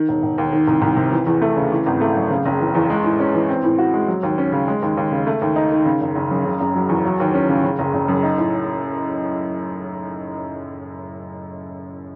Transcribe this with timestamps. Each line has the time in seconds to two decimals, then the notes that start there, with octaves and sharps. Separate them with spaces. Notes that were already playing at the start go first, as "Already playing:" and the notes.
Already playing: D#3
0.09 E1
0.23 E1
0.38 D#2
0.52 D#3
0.68 C2
0.82 C2
0.97 C3
1.12 E3
1.27 E2
1.42 A3
1.56 C#3
1.71 E3
1.86 G#1
2.01 A3
2.16 F#2
2.30 C#3
2.46 F#1
2.60 E3
2.75 E2
2.90 G#3
3.04 A2
3.20 C#4
3.34 E3
3.49 C4
3.63 A2
3.78 F#4
3.93 G#3
4.08 F#3
4.23 D#2
4.38 C#4
4.52 C#3
4.68 G#3
4.82 D#2
4.97 D#2
5.12 C#3
5.27 A3
5.42 D#2
5.56 D#4
5.72 D#3
5.86 C#3
6.01 F#1
6.15 F#1
6.31 F#2
6.45 C#3
6.60 F#1
6.75 F#3
6.89 E2
7.05 F#3
7.20 D#2
7.34 C#4
7.49 C#3
7.64 C#3
7.79 F#1
7.94 F#1
8.08 F#2
8.23 D#4
8.38 A2